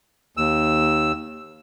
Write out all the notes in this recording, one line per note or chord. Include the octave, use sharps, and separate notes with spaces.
D#2 E6